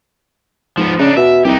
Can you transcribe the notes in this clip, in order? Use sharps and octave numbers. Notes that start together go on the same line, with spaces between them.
G#2 F3 B3
C#3 D4 D#4
B2 E5
C2 D#4 G4